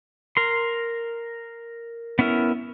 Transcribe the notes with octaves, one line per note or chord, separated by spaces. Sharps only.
A#4 C6
B3 C#4 E4 A#4